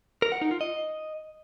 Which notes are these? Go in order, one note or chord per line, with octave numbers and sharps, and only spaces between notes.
A#4
F#5
D#4
F4
D#5